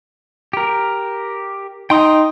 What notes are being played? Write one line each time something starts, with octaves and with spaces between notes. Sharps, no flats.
G4 A#4
D#4 G5 C6 D#6